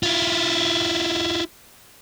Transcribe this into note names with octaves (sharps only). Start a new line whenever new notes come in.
E4 F4